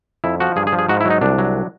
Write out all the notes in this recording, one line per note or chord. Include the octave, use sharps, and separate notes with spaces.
F2 E4
F3 F#4
G2 G#4
G#4
F3
G#4
G#2 F#4
E4
F#3 D#4
C2 D4
F#3